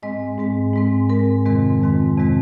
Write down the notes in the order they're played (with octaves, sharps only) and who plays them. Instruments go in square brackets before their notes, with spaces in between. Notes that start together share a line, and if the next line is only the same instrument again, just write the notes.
[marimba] G#2 G#3 C4 D#5
G#2 G#3 C4
G#2 G#3 C4
G#2 G#3 C4 A#4
F2 C3 D#3 G#3 C4
F2 C3 D#3 G#3 C4
F2 C3 D#3 G#3 C4